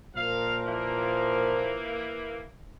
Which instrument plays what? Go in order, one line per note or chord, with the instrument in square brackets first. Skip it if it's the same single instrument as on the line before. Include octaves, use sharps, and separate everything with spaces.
[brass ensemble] A#2 F3 A#4 [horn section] F5
[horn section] E3 A#3